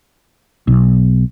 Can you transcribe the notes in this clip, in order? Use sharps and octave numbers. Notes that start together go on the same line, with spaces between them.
B1